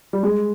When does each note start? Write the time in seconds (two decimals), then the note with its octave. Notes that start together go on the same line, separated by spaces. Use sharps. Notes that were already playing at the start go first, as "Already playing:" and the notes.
0.13 G3
0.23 G#3